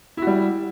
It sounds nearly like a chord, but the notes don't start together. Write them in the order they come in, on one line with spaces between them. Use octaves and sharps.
E4 F#4 G3